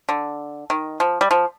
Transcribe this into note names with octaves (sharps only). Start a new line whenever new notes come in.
D3
D#3
F3
G3
F3